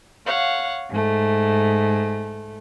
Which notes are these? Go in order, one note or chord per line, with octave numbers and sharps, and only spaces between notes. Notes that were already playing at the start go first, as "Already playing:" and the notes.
C#5 F5 F#5
G#2 A3